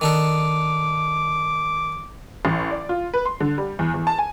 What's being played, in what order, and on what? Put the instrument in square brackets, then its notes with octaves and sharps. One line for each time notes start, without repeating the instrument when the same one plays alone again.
[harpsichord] D#3 D4 A4 [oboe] D6
[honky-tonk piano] A1
D5
F4
B4
C6
D3
G3
E2
E2
A5
G#5